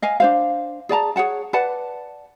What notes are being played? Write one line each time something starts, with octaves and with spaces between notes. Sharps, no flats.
D#5 F5 G#5
D4 C5 F5
G#4 D5 A5 A#5
G#4 C#5 F#5 A5
B4 D5 F#5 A5